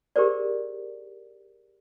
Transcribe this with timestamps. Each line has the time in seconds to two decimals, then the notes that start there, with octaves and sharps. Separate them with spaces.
0.16 G4 G#4 A#4 C5 D5